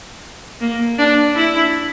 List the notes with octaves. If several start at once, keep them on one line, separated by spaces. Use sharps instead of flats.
A#3
D4
E4